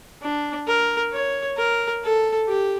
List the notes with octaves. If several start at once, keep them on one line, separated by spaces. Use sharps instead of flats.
D4
A#4
C#5
A#4
A4
G4